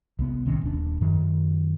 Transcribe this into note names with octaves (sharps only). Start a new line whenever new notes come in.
C2 B3
A1 C3 D#3 C#4
D#1 D4
F#2 D#3